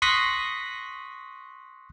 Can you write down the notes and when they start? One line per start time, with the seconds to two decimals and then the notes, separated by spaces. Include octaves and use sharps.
0.02 C6 C#6 D#6 F#6 A#6 B6